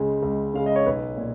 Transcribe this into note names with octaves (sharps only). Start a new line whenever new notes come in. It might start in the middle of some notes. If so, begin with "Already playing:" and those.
Already playing: C#2 C#3 G#3
C#2
C#3 G#3 F5
D#5
C#5
B1 B4
A#2